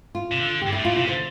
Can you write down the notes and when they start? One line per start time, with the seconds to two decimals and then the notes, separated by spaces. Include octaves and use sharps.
0.15 F4
0.32 C3
0.38 D3
0.62 G4
0.67 G2
0.72 E4
0.76 A2
0.85 A#2 F4
0.96 C3 F4
1.08 D3 C5